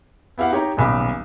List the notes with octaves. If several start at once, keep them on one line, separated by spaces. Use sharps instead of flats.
B3 E4 G4 F5 F#5
D#4 G4 C#5 A#5
D#1 B1 B5 D6